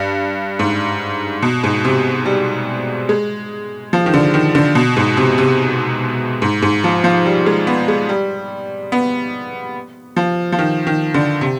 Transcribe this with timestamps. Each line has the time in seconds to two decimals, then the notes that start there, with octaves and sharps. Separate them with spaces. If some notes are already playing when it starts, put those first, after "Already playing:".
Already playing: G2
0.59 G#2
1.43 B2
1.64 G#2
1.85 C3
2.26 G3
3.09 G#3
3.93 F3
4.06 D#3
4.14 D3
4.34 D#3
4.55 D3
4.75 B2
4.97 G#2
5.17 C3
5.38 C3
6.42 G#2
6.62 G#2
6.84 F3
7.04 F3
7.26 G3
7.46 G#3
7.67 B3
7.88 G#3
8.09 G3
8.92 B3
10.17 F3
10.52 F3
10.59 D#3
10.87 D#3
11.14 D3
11.41 C3